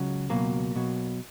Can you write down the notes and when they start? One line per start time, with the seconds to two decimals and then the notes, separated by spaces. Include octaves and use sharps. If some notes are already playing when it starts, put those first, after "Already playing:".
Already playing: C#2 C#3 F#3
0.30 C#2 B2 F#3 A#3
0.76 B2 F#3